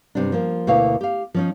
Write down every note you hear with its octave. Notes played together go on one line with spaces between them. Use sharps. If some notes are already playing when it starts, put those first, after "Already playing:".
G2 C3 D4
F3 A#3
D2 B2 A#3 E4 C#5 F5
G4 F5
F3 C#4 D#4